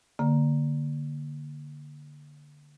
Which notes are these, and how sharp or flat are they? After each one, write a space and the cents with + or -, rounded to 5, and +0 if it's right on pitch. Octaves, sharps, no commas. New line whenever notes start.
D3 +0 A#3 +0